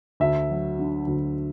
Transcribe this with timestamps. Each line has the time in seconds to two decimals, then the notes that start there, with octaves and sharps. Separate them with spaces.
0.20 D2 E5
0.50 F#3
0.79 D3
1.07 D2